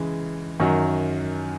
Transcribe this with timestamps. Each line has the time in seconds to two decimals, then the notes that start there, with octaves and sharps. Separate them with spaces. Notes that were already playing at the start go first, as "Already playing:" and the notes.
Already playing: C#3 E3 G#3
0.60 F#2 D#3 F#3